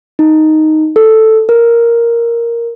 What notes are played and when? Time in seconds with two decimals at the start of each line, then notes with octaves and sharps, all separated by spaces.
0.19 D#4
0.96 A4
1.49 A#4